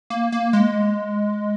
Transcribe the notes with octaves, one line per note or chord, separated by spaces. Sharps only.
A#3
A#3
G#3